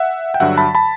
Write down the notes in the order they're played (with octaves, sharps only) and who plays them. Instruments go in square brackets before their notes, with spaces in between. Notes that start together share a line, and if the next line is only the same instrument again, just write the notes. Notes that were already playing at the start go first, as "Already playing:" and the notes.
Already playing: [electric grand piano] E5 F#5
G5
G2 D3 F#3 E5 F#5
A5 B5
A5 B5